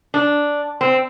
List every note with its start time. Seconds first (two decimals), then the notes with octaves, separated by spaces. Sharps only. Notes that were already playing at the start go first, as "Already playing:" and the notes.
0.14 D4
0.81 C4